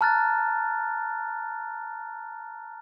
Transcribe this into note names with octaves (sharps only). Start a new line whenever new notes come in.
A5 A#5 F6 F#6 A6